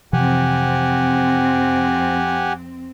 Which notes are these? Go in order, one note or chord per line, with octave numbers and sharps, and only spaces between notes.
F2 C3 E3 F3 C4 G4 F#5 G#5